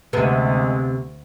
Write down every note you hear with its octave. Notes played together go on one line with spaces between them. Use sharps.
D2 C3 G#3 B3